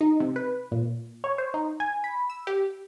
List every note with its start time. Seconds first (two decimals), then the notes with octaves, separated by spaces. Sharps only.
0.01 D#4
0.20 C3
0.36 B4
0.72 A#2
1.24 C#5
1.38 C5
1.54 D#4
1.80 G#5
2.04 B5
2.30 E6
2.47 G4